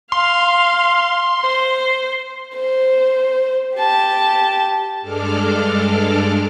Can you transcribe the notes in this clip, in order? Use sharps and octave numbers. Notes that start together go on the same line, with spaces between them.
F5 C6
C5
C5
G4 A5
G2 G#3 D4 A4 D6 F6